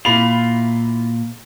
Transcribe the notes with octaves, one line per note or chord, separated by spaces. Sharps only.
A#2 E4 F4 B5 F7